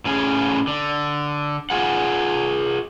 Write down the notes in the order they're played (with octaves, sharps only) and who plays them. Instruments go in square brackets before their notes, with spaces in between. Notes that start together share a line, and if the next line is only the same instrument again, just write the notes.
[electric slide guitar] A2 C#4 G#4
D3
F4 G#4 F#5